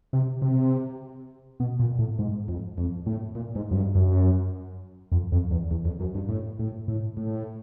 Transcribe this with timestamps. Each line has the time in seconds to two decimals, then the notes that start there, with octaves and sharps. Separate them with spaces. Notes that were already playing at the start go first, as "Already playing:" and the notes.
0.13 C3
0.42 C3
1.60 B2
1.79 A#2
1.99 A2
2.19 G#2
2.48 F2
2.78 F2
3.06 A2
3.35 A#2
3.55 G#2
3.71 F#2
3.76 G2
3.95 F#2
5.12 F2
5.32 F2
5.51 E2
5.71 E2
5.85 F2
6.00 F#2
6.15 G2
6.29 A2
6.59 A2
6.88 A2
7.17 A2